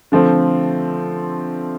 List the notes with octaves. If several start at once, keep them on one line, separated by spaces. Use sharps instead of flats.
D3 F3 A3 C4